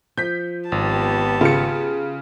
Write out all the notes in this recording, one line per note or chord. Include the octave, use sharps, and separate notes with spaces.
F3 G6 B6
G#1 B3 G4 A5
C#3 F4 C#7